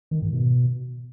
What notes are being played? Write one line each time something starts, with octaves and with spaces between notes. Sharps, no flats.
D#3
G#2
B2